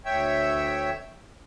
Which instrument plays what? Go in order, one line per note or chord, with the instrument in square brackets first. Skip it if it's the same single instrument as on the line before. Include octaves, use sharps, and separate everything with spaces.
[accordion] D2 C#5 E5 G5 E6